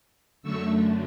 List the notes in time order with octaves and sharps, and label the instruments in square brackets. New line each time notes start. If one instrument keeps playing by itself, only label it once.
[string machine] F#2 D3 A3 C#6 E6